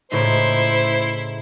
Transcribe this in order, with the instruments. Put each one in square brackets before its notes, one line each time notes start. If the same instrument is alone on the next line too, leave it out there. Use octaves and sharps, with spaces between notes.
[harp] A2 C#3 D#4 [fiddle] E4 C6 [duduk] C5